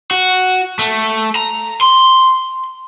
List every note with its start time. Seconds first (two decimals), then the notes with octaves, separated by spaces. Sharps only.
0.11 F#4
0.79 A3
1.36 A#5
1.81 C6